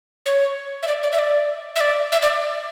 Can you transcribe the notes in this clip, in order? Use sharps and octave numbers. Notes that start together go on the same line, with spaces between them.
C#5
E5
D5
D5
E5
D5
E5
D5
E5
D5